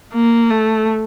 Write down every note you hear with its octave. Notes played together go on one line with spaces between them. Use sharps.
A#3
A3